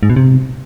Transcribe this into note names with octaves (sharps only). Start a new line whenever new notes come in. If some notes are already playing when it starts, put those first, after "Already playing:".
G#2
B2
C3